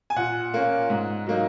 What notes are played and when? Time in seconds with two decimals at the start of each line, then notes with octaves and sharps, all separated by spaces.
0.10 G#5
0.16 A#2 F#5
0.54 A#3 C#4
0.90 G#2
1.26 F#3 A#3 D#4